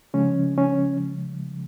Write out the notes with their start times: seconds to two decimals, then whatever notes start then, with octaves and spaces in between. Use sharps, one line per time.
0.14 C#3 F3 G#3 C#4
0.58 C#4